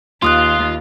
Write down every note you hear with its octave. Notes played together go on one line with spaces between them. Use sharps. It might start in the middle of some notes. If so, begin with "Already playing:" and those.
D#2 F4 C6 D#6 F#6